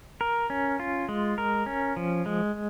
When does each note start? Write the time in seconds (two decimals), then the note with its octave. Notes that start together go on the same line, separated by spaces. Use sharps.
0.21 A#4
0.50 C#4
0.80 F4
1.09 G#3
1.38 A#4
1.66 C#4
1.97 F3
2.26 G#3